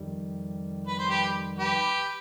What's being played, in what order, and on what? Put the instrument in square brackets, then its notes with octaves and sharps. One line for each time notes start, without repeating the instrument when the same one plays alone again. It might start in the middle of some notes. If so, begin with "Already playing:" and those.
Already playing: [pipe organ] F2 D#3 G3
[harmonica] B4
C5
G4 B4
G4 B4